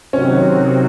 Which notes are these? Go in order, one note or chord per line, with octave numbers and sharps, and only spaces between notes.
C3 D#3 F#3 C4 C#4 F#4